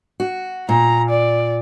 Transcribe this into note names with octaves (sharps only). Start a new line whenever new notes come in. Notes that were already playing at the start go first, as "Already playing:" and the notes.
F#4
A#2 A#5
D5